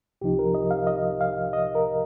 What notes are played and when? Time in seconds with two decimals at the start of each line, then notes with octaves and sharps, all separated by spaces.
0.21 C2 C3 F3 D#4 G4
0.39 A#4
0.54 D#5
0.71 F5
0.87 D#5
1.21 F5
1.53 D#5
1.75 A#4